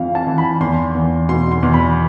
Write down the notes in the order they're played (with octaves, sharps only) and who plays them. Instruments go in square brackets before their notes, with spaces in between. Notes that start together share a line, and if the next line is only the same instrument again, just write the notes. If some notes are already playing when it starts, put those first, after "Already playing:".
Already playing: [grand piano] F2 E3 F5
A5
E3
B5
E2 C6
E2
B2 C6
C6
E2
B5